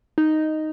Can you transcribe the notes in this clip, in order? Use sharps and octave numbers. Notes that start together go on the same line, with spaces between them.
D#4